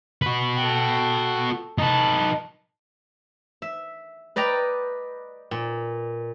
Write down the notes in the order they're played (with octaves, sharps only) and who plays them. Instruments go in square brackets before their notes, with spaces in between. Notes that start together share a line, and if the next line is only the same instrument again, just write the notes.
[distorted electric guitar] F#4 B4
[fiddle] A4 G5
[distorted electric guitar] D#4 B4 [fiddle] A5
[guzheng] E5
B4 D5 D#5 G5 A#5
A#2